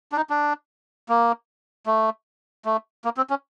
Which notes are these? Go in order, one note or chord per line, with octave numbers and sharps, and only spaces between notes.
D4
D#4
D4
A#3
A3
A3
A#3
C4
C#4